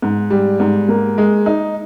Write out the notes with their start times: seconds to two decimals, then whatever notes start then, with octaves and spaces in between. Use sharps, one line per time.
0.02 G#2
0.30 G3
0.60 G#2
0.88 A#3
1.18 G#3
1.46 D#4